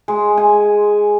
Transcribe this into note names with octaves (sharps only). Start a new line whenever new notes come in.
G#3
G#5